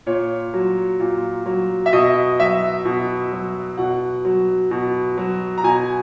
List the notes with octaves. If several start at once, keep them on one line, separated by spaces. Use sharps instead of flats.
A#2 C#5
F#3
A#2
F#3
E5
B2 D#5
F#3 E5
B2
F#3
B2 F#5
F#3
B2
F#3
A#5
B2 G#5